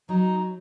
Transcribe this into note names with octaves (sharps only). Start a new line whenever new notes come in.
F#3 D#4